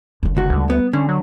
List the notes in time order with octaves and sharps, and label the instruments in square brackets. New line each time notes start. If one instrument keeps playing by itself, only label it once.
[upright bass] F#1 D3
[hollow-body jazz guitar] C#2 F#4
[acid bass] D2 [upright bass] G3
[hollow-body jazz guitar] B3
[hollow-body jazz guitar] D3 [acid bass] C#4
[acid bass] F#3